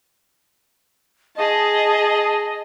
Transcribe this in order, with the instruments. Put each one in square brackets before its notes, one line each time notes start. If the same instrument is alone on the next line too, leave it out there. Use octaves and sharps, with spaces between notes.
[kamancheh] G#4 A5 [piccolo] D#5